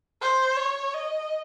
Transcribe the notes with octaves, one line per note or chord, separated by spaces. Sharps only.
C5
C#5
D#5